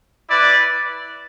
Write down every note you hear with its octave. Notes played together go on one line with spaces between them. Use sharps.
E4 B4 D5